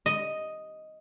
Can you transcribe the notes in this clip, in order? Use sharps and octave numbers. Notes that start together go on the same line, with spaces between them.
D#5